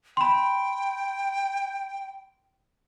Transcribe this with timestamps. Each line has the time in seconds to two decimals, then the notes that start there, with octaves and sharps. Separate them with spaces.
0.17 G5 B5 C6